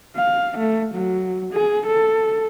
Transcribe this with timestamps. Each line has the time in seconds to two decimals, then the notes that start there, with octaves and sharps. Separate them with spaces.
0.16 F5
0.58 A3
0.95 F#3
1.53 G#4
1.86 A4